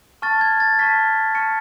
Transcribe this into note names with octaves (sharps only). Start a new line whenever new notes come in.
A5 C#6 F6 A6
G#6
A6
A5 C#6 F6 B6
A5 C#6 F6 C#7